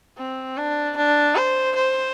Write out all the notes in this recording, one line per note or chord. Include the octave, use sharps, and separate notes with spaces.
C4
D4
D4
C5
C5